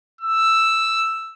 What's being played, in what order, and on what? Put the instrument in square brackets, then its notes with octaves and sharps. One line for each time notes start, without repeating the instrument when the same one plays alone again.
[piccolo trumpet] E6